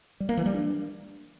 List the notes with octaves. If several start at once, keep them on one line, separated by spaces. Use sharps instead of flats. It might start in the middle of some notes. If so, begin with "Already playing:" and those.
G3
A#3
E3
G3
D4